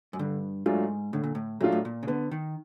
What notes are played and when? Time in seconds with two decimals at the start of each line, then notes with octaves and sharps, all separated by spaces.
0.13 F#2
0.19 G2 D3
0.66 G#2 F#3 A3 D4 F4
1.13 A2 D3
1.24 A#2
1.35 A2
1.60 A#2 F#3 A3 D4 F4
1.72 A2
1.85 A#2
2.03 C#3
2.07 D3 B3
2.31 D#3